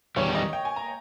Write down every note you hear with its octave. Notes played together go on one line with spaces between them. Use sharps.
E2 D#3 G3 C#5
D#5
G5
G#5
A#5